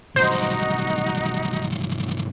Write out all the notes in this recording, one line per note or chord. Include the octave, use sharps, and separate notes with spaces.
B1 G2 D#4 F#4 C5